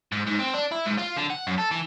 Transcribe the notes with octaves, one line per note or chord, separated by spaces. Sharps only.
G#2
G#2
C4
D4
E4
G#2
F4
D3
F#5
F#2
A4
E3